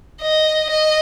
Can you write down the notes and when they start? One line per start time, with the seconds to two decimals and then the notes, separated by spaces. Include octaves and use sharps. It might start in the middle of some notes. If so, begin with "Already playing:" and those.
0.22 D#5
0.70 D#5